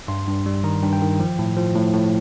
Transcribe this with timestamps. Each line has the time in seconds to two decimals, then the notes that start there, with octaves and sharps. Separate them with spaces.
0.08 G2 C6
0.28 G2
0.46 G3
0.64 D#3 A#5
0.83 G2
0.93 G5
1.01 D#3
1.20 F3
1.39 A2
1.57 F3
1.75 A2
1.93 A2